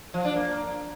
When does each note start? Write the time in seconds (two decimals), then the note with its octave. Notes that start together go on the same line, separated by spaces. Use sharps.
0.14 F3
0.25 D4
0.36 A#3